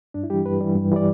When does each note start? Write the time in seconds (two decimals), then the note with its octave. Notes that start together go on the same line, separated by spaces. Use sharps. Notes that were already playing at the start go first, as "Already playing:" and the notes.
0.14 G2 D4
0.24 E4
0.30 E3 G3 G4
0.46 G2 B4
0.61 E3 G3
0.76 G2
0.92 E3 G3 D5